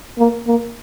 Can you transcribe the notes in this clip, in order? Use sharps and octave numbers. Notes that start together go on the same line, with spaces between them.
A#3
A#3